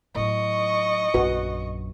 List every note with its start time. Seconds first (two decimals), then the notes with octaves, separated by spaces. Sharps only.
0.15 A2 F#3 D#5 C#6
1.14 A#1 F#2 F#4 B4